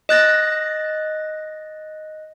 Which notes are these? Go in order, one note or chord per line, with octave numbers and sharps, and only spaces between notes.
D#5 F#6 A6 A#6